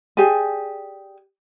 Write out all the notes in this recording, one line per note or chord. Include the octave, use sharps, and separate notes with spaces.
G4 G#4 D5 G#5